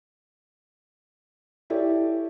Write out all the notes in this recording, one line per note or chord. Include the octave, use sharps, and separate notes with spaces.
E4 G4 A4 C#5 D5